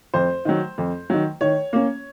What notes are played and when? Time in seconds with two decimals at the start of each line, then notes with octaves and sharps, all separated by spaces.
0.14 F2 C5
0.45 D#3 F#3
0.78 F2
1.10 D#3 F#3
1.41 D#3 C#5
1.73 A#3 C#4